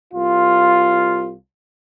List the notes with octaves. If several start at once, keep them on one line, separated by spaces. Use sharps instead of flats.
C2 F4